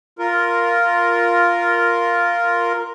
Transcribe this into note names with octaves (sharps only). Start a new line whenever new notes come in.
F4 A#4